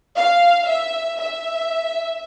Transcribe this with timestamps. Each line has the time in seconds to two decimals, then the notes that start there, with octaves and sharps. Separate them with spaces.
0.15 F5
0.66 E5
1.18 E5